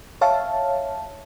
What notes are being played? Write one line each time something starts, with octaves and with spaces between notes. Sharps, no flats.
C#5 E5 F5 A5